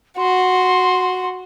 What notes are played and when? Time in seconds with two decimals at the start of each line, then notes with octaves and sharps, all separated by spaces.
0.17 F#4 C6